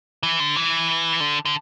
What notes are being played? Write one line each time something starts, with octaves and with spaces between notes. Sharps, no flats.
E3
D3
E3
D3
D3